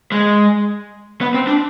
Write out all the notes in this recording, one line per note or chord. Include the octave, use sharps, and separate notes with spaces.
G#3
B3
C4
D4